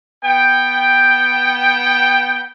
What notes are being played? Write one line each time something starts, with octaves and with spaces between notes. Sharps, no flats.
B3 G5